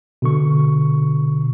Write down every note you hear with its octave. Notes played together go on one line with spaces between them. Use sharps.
B2 D3 C#6